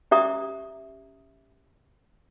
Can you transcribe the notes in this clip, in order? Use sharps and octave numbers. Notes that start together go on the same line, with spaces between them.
C#4 G4 D5 E5 A#5 D#6